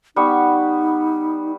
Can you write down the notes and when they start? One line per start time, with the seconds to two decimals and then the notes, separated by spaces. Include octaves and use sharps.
0.16 G3 B3 D#4 C#6